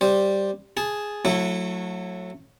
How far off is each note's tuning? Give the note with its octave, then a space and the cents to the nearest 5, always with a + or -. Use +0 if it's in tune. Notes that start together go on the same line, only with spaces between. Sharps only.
G3 +0 C5 +0
G#4 +0 A5 -15
F#3 -25 A3 +10 E4 +0